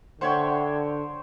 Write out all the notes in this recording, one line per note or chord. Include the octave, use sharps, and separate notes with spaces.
D3 C5 C#5 E5 F#5 G5